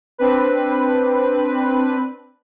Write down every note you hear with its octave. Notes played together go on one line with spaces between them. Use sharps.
C4 D4 B4